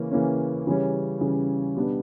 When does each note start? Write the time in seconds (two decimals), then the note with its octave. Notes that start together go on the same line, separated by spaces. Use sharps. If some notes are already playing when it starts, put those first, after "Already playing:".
Already playing: C#3 E3 A#3 C#4
0.11 C#3 E3 A#3 C#4
0.67 C#3 E3 G3 C#4
1.21 C#3 E3 G3 C#4
1.77 B2 G3 B3 D4